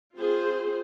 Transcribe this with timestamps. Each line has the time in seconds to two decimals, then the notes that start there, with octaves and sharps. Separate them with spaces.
0.16 C4 F4 G#4 C5